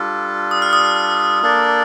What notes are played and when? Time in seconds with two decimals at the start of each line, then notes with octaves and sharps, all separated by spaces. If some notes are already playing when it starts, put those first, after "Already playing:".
Already playing: G3 D4 F4 A4
0.51 D#6
0.62 F6
0.73 D#6
1.42 A#3 D4 A4 D5